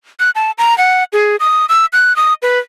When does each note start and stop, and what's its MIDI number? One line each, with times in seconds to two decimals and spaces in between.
0.20 0.30 90
0.35 0.51 81
0.58 0.77 82
0.78 1.04 78
1.13 1.36 68
1.40 1.66 87
1.69 1.86 88
1.93 2.16 90
2.16 2.34 87
2.42 2.59 71